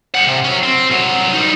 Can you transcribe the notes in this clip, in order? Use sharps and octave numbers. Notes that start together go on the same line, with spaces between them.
G4 F#5
C3
F#3 C#4
C4
C2 F#3
G3 D#4